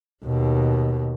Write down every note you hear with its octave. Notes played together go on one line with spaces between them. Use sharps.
D#2 B2